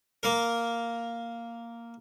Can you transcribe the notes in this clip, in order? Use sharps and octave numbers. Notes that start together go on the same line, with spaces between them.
A#3 A#4